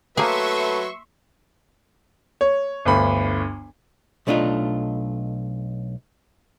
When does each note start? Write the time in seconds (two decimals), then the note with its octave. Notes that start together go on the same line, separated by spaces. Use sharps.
0.17 F#3 A3 A#3 G#4 B4 E5 C6 C#6
2.41 C#5
2.85 G1 D2 B5
4.27 B1 A3 D4 D#4 F4